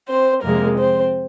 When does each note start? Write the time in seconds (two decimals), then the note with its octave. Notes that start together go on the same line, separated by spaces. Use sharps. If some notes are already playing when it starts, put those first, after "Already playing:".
0.09 C4 C5
0.44 F2 C3 F3 G#3 A#3 A#4
0.78 C4 C5